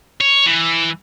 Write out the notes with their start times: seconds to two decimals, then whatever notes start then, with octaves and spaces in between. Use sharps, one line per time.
0.21 C#5
0.46 E3